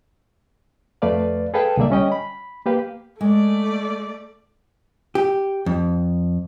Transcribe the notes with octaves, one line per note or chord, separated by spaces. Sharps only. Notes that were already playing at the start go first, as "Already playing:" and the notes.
F2 A3 B4 D5 F5
G#4 A4 B4 F5 G5 A5
C2 B2 D3 A#3 D5 E5
G3 C#4 D#5 G5
B5
A#3 G4 B4 F5
G#3 A3 D5
G4
F2